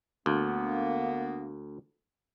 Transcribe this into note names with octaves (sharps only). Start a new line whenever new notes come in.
D2 A#3 B3